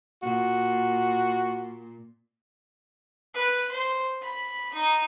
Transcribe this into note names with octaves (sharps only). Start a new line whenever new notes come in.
A#2 F#4
B4
C5
B5
D#4